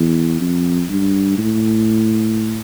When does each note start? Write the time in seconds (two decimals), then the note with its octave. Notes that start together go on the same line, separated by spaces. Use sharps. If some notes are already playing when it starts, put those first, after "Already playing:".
Already playing: E2
0.41 F2
0.90 G2
1.38 A2